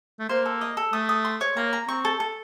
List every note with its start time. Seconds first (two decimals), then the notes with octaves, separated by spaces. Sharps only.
0.20 A3
0.29 A#3 C5
0.46 A4
0.61 D#5
0.77 A4
0.93 A3 D#6
1.09 D#6
1.25 C6
1.41 C#5
1.57 A#3 A#5
1.73 A#5
1.88 C4 C#6
2.05 A4
2.20 A4